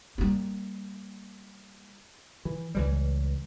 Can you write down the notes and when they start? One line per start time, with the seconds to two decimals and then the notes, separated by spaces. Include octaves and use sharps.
0.18 G3 A#3
2.45 E3
2.75 C#2 E3 G3